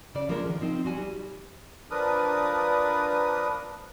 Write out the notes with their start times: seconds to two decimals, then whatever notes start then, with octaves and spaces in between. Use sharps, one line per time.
0.15 C#3 D5
0.29 F3 G#3 A#3 D4 A#4
0.46 D#3 F3
0.61 F3 C4 D#4
0.85 G3 F#4 G#5
0.98 G3
1.91 F3 D4 A#4 B4 D#6